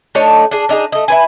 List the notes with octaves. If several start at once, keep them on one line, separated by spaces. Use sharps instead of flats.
A3 D4 D#4 C#5
D4 G#4
D4 D#4 G4 G#4
A3 D#5
E4 B4 G#5